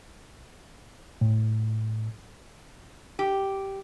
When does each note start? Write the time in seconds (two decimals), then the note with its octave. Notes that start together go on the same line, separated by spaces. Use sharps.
1.21 A2
3.19 G4